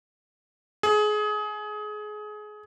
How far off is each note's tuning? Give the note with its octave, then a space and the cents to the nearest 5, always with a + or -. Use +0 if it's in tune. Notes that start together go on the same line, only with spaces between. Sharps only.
G#4 +25